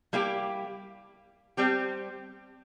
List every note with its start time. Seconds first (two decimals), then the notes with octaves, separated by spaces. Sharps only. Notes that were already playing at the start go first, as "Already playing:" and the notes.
0.13 G3 A#3 E4 G4
1.57 G3 C4 G4